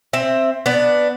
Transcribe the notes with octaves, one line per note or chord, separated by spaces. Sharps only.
C4 E5
B3 D4